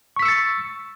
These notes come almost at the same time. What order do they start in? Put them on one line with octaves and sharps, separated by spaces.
C#6 B6 E6 C#7 A6